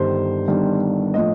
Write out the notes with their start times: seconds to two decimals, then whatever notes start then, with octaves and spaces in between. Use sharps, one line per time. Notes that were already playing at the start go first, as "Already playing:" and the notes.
Already playing: G1 G2 D#3 G3 C5
0.48 G1 G2 D#3 G3
1.14 A2 F3 D#5